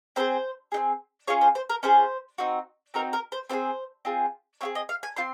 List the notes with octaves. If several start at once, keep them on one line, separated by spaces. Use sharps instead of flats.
C4 D#4 G#4 C5
C4 D#4 G#4
C#4 F4 G#4 C#5
C5
C5
A#4
C#4 F4 G#4 C5
C4 D#4 F#4
C4 D#4 F#4 A#4
A#4
C5
C4 F4 G#4 C5
C4 F4 G#4
C4 F4 G#4 C#5
D#5
F5
G#5
C4 F4 C6